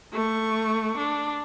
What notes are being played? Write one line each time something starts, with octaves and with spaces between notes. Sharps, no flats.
A3 C#6
D4